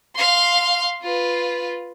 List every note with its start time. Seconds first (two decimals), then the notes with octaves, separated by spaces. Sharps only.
0.16 F5 C6
1.03 F4 B4